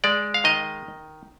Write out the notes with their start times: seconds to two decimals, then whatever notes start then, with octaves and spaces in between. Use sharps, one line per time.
0.04 G#3 D5
0.34 F5
0.44 D#3 D#5